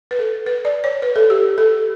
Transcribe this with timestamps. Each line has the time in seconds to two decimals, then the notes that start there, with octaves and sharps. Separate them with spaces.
0.11 B4
0.19 A4
0.46 B4
0.65 D5
0.84 C#5
1.02 B4
1.16 A4
1.30 G4
1.58 A4